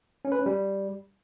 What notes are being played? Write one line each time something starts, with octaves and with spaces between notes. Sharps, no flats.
C#4
B4
C#4
G3